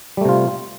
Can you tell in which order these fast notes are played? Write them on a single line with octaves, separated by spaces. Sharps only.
G3 A3 C3 F4